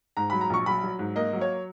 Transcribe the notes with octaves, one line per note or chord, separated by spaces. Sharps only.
G#2 A#5
F#3 B5
A#5
A#1 C#6
F#3 B5
F#3
G#2
A#3 D#5
F#3
C#5